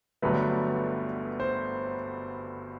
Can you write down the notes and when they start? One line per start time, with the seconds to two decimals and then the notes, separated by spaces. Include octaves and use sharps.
0.22 G1 G2 F#3 A3 B4
1.40 C5